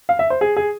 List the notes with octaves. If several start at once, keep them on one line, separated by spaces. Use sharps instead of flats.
F5
E5
C5
G#4
G#4